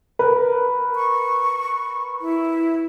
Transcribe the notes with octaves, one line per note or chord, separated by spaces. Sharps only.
A#4 B4
C#6
E4